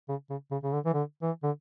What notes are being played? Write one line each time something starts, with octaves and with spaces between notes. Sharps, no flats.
C#3
C#3
C#3
C#3
D3
E3
D3
E3
D3